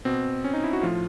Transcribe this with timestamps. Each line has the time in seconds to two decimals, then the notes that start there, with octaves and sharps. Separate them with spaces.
0.05 B2 C4
0.44 C#4
0.53 D#4
0.64 E4
0.73 F#4
0.82 A2 F3 F4